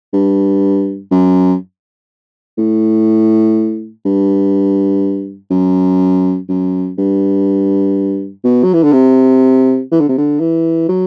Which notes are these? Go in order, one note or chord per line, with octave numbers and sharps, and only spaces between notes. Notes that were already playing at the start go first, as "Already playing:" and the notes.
G2
F#2
A2
G2
F#2
F#2
G2
B2
F#3
E3
D3
C3
E3
D3
C3
D3
E3
F#3